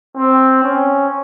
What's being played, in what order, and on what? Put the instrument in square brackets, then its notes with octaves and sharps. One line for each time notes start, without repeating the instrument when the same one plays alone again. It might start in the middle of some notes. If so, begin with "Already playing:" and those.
[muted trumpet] C4
C#4